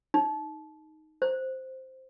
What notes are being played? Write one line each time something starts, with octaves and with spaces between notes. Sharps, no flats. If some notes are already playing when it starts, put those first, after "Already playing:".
D#4
C5